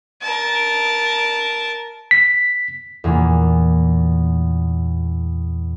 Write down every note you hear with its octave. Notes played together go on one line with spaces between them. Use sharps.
A#4 A5
B6
E2 A#2 A#3